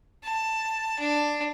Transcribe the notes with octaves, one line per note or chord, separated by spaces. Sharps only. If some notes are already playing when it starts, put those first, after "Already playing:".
A5
D4